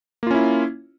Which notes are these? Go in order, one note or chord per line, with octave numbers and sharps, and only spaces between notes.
A#3 C#4 E4 F4